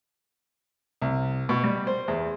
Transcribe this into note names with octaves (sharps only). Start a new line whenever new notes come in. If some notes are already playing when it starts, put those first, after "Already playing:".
C2
B2
G3
C5
E2